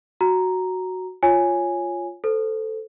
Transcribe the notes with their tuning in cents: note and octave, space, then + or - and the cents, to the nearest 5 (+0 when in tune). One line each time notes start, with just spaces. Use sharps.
F#4 +0 A#5 +0
F4 +0 C#5 +0 G#5 +0
A4 +0 C5 -20